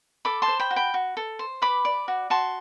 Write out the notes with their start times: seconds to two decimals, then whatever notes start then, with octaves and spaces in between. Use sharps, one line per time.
0.25 A4 B5 D6
0.42 A5 C6
0.48 C5
0.60 G5 B5
0.70 F#4
0.76 G5 B5
0.94 F#4
1.17 A4
1.39 C5
1.62 B4 B5 D6
1.85 D5
2.08 F#4
2.30 F#4 A5 C6